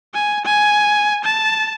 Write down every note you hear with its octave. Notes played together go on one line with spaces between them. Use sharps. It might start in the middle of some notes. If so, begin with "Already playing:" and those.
G#5
G#5
A5